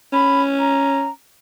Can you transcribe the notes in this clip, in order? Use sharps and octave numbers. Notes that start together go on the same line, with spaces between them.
C#4 B5
A#5